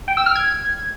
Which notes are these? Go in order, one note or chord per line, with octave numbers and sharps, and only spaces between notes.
G5
E6
F6
G#6